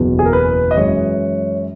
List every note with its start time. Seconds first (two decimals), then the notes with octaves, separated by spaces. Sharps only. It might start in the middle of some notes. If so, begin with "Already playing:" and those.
Already playing: F#1 E2 B2
0.19 G#4
0.25 A#4
0.33 B4
0.71 D#5
0.76 F#2 E3 G#3 C#5